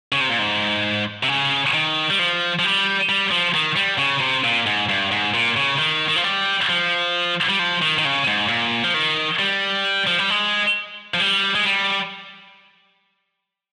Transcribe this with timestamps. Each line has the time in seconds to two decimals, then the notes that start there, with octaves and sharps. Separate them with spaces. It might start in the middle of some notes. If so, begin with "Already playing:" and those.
0.12 C#3
0.21 C3
0.30 A#2
0.39 G#2
1.23 C3
1.28 C#3
1.74 D#3
2.10 G3
2.19 F3
2.59 F3
2.64 G3
3.09 G3
3.31 F3
3.54 D#3
3.76 G3
3.99 C#3
4.21 C3
4.44 A#2
4.66 G#2
4.89 G2
5.11 G#2
5.34 A#2
5.56 C#3
5.79 D#3
6.08 D#3
6.16 F3
6.24 G3
6.69 F3
7.49 G3
7.59 F3
7.82 D#3
7.98 D#3
8.05 C#3
8.27 G#2
8.49 A#2
8.84 F3
8.94 D#3
9.39 G3
10.07 F3
10.19 G3
10.30 G#3
11.14 F3
11.20 G3
11.55 G#3
11.65 G3